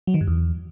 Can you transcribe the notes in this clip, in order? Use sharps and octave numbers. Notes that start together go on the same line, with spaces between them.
F#3
D#3
G2
E2